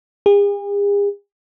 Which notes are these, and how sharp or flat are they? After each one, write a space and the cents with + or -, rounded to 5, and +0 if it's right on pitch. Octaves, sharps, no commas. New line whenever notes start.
G#4 -45